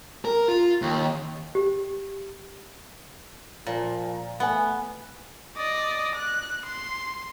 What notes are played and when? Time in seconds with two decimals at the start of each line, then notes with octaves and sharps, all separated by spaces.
0.25 A#4
0.48 F4
0.82 D#2
1.55 G4
3.67 A#2 F3
4.40 A3 B3 F#5 G#5
5.57 D5 D#5
6.15 F#6
6.65 C6